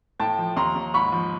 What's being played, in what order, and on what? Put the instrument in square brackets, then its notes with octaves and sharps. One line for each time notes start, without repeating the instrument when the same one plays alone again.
[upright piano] A2 G5 A5
F3
D#2 A#5 C6
D#2
G#2 B5 C#6
F3